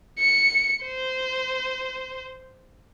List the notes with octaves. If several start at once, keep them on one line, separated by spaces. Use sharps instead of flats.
C#7
C5